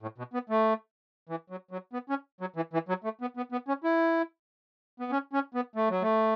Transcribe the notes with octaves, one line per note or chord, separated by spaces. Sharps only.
A2
B2
B3
A3
E3
F#3
F#3
B3
C#4
F#3
E3
E3
F#3
A3
B3
B3
B3
C#4
E4
B3
C#4
C#4
B3
A3
F#3
A3